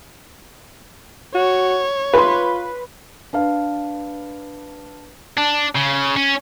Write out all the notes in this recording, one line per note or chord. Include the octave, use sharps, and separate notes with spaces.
F#4 C#5
F4 B4 C6
D4 B4 F5
D4
C#3
C#4